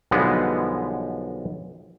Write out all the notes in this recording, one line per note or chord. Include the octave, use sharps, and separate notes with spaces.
B1 D3 F3 G3 G#3 B3